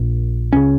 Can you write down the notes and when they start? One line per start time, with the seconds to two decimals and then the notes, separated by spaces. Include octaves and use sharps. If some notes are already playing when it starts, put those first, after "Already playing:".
Already playing: A#1 A#2
0.53 C#2 C#3 C#4